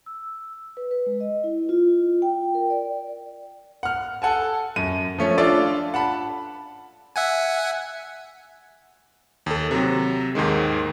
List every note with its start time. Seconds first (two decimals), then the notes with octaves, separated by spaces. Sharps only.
0.06 E6
0.77 B4
0.91 B4
1.06 G#3
1.20 D#5
1.44 E4
1.69 F4
1.88 F4
2.22 G5
2.55 A#4
2.70 D5
3.83 F#5 F6
4.22 A4 F#5 G#5 A5
4.76 F#2 D#7
5.18 F3 A3 C#4
5.38 D4 F4 A4 D5 E5 F5
5.94 F#5 A5 B5
7.16 E5 F#5 G#5
9.46 D#2 A4
9.71 C3 F#3
10.35 D#2 G#2 D#3 G#3